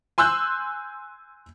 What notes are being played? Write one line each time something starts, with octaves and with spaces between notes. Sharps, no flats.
G#5 C6 E6 F#6 G6